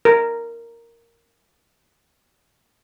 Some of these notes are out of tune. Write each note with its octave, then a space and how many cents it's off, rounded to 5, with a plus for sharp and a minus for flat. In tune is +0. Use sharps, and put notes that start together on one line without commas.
A#4 -5